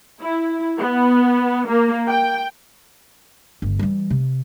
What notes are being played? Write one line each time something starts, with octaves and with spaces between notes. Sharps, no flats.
E4
B3
A#3
G5
G1
E3 G3
C3